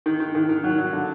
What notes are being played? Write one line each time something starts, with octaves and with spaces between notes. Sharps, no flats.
D#3
D#3
D#3
D#3
F#3
F#3
D3